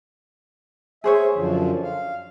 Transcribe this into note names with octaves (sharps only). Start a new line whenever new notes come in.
G#4 C5 C#5 E5
F#2 D3 F3
F5